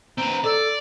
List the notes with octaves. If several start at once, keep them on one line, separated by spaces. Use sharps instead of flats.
C4 B4 A#5
A4 D5